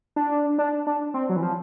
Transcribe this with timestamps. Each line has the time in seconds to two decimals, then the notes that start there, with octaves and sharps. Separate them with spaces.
0.16 D4
0.58 D4
0.87 D4
1.14 C4
1.29 F#3
1.36 E3
1.43 F3